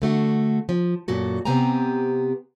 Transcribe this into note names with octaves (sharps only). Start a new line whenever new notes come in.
D3 A3 F#4
F3
F#2 A#2 F#4 A4
C3 B3 C4 G4 G#5 A#5